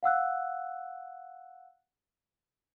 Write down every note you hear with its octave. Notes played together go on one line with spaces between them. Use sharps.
F5 F#5 E6 F#6